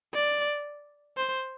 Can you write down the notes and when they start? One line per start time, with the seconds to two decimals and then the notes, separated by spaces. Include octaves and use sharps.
0.14 D5
1.17 C5